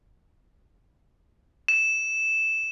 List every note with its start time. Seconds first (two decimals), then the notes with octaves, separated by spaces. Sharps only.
1.68 E7